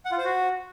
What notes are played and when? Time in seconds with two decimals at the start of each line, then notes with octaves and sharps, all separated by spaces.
0.05 F#5
0.12 F4
0.18 C5
0.24 F#4